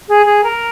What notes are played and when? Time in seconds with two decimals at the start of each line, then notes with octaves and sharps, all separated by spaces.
0.08 G#4
0.25 G#4
0.43 A#4